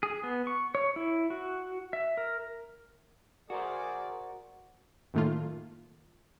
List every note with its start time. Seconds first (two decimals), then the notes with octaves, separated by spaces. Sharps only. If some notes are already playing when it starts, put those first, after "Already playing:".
0.03 G#4
0.23 B3
0.47 C#6
0.75 C#5
0.96 E4
1.30 F#4
1.93 E5
2.17 A#4
3.50 F#4 G#4 A#4 C5 D5
5.14 F#2 A2 D#3 A3 A#3 F4